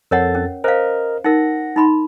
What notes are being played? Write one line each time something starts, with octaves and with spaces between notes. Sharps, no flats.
F2 A4 A#4 C#5 F#5 A6
C#4
A#4 C5 D#5 F5
D#4 A#4 F#5 A#6
D#4 B5 C6